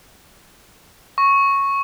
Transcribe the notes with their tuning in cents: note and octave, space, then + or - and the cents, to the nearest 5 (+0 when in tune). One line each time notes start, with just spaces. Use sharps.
C#6 -5